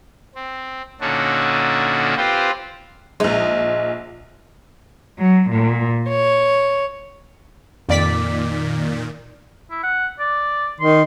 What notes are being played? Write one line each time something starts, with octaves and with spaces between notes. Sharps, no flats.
C4
A#2 D3 C#4 D#4 F#4 A4
C4 F4 G4 B4 C5
A#1 G#3 D#4
F#3
A#2
C#5
F2 A#2 D#3 D5 B6
E4
F#5
D5
D#3 C6